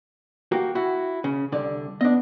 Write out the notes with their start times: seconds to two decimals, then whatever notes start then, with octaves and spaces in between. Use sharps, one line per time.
0.52 A#3 F#4 G4
0.75 E4 F#4
1.24 C#3
1.52 C2 D3 D5
2.01 B3 D4 D#5